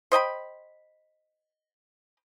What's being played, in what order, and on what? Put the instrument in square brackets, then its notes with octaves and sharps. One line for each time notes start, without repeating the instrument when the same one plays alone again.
[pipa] C5 D#5 G5 B5